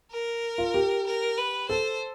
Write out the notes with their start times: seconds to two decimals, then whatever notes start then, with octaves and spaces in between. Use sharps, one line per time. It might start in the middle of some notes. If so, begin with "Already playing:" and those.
0.11 A#4
0.58 F4
0.74 G4
1.07 A#4
1.38 B4
1.69 A4 C5